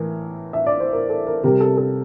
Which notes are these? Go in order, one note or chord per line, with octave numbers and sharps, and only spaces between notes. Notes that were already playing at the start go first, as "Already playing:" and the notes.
Already playing: A2 E3 A#4
E5
D5
C5
A#4
A4
A#4
C3 G3 A#4
A4
A4